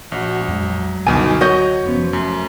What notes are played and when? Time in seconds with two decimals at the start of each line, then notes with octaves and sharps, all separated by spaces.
0.12 A#1 F#4
0.48 F2 F#3 G#3
1.06 G1 C#2 B2 D3 D#4 G#5
1.41 F#4 C#5 D#5 G6
1.84 F1 F3 B3 C#4
2.13 F#2 A3